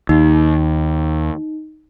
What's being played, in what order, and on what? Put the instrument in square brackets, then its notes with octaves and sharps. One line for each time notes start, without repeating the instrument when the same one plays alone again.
[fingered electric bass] D#2 [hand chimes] D#4